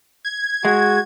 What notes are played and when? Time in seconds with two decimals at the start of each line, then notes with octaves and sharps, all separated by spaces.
0.25 G#6
0.65 G#3 F#4